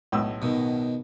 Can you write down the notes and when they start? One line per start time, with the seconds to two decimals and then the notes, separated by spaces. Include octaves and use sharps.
0.12 B1 A2 E6
0.42 B2 D#3